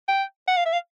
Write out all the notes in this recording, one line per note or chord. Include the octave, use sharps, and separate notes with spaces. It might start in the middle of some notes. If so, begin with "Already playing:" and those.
G5
F#5
F5
E5
F5